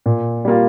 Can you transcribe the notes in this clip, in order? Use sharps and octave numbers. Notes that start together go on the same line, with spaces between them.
A#2
G3 A#3 F4